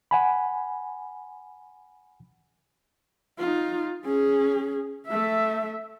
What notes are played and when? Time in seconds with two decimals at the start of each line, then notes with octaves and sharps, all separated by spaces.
0.11 F#5 G#5 B5
3.39 D#4 F4
4.05 C#4 G#4
5.08 A3 E5